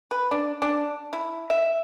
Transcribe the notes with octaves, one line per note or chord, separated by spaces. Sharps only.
B4
D4
D4
E4
E5